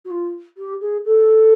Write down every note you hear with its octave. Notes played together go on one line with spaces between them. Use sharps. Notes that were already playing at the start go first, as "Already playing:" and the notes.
F#4
F4
G4
G#4
A4